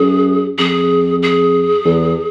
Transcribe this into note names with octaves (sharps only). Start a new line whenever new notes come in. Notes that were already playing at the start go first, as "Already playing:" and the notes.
Already playing: F#2 G#4
F2 G#4
G#4
E2